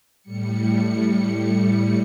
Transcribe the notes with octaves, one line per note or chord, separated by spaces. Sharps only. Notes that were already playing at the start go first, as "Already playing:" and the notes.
A2 G3 C#7